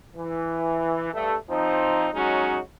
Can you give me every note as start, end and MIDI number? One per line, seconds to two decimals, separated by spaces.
0.16 1.12 52
1.13 1.35 43
1.13 1.35 57
1.49 2.08 53
1.49 2.08 60
1.49 2.08 63
2.13 2.58 54
2.13 2.58 56
2.13 2.58 61
2.13 2.58 63
2.13 2.58 66